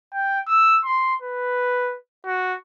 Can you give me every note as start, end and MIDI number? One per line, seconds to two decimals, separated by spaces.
0.14 0.40 79
0.47 0.79 88
0.84 1.14 84
1.22 1.96 71
2.26 2.55 66